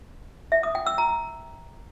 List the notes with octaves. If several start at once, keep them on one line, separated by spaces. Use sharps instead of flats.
E5
D#6
G5
E6
A#5